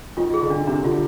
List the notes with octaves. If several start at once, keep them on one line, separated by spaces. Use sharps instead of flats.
D#3 F4
G#4
D3
D4
C3 D4
D3 F4